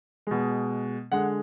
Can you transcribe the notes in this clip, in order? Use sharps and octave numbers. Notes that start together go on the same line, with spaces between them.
B2 G#3
D3 G#3 F#5